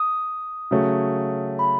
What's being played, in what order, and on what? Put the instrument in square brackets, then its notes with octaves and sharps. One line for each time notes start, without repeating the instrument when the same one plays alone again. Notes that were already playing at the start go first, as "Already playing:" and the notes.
Already playing: [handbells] D#6
[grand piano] C#3 F#3 A3 C#4 F#4
[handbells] B5